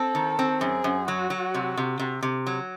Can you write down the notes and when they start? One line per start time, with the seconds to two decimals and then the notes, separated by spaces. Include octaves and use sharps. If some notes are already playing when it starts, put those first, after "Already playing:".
Already playing: C4 A4
0.15 D#3
0.39 C4
0.61 F#2 G#4
0.84 F#2
1.08 F#3 F#4
1.30 F#3
1.54 C3
1.77 C3
1.99 C3
2.23 C3
2.47 F#3